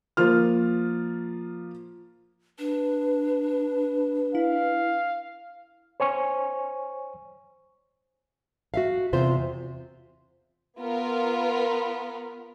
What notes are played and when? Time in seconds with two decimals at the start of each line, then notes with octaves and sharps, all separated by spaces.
0.17 F3 A#3 F4 F6
2.59 D4 B4
4.35 E4 F5
6.00 C5 C#5 G#5 C#6
8.74 F#4 E5 F5
9.13 E2 C3 F4 C5 E5
10.79 B3 F4 A#4